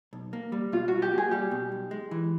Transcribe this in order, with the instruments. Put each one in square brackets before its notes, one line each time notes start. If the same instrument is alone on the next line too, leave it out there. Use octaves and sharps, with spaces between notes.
[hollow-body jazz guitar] B1
A#3
G3
[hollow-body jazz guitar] B2 [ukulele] F4
[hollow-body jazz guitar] B1 [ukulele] F#4
[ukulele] G4
[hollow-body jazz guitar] A#3
[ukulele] G#4
[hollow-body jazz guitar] G3 [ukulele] G4
[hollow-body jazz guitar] B2
B1
G#3
E3